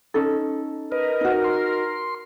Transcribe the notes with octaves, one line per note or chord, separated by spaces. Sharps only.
C#4 D#4 A4
A#4 B4 D#5
D#4 F#4
C6